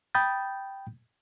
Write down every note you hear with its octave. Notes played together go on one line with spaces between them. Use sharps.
G5 B5 D#6 G6 A6